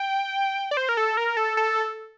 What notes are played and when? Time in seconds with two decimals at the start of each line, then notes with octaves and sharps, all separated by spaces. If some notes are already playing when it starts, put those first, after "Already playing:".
Already playing: G5
0.71 D5
0.77 C5
0.89 A#4
0.97 A4
1.17 A#4
1.37 A4
1.57 A4